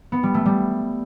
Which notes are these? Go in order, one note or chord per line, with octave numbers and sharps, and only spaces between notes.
B3
G3
A3
G3